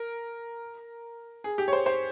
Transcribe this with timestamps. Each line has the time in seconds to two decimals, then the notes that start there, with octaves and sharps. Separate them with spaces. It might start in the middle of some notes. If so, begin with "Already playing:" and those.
Already playing: A#4
1.44 G#4
1.58 G4
1.68 C#5
1.73 C5
1.86 C5